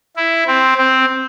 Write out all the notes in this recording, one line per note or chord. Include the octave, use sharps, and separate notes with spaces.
E4
C4
C4